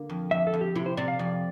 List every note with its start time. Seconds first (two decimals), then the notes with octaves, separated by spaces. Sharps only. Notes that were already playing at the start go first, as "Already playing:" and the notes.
Already playing: D3 A#3
0.10 F2
0.31 F2 E5
0.47 A4
0.53 F2
0.61 G4
0.75 C3 E4
0.86 C5
0.97 C3 D5
1.08 F5
1.19 F2 D5